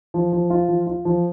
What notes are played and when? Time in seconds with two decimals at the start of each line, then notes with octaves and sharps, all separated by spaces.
0.14 F3
0.32 F3
0.50 F4
0.68 F3
0.87 F4
1.05 F3